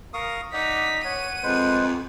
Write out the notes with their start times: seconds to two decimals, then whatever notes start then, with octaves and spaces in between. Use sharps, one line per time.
0.14 A#4 F5 C#6 D#6
0.53 D#4 D5 F#5 B6
1.04 C#5 F#5 D#7
1.43 F2 G#3 B4 C5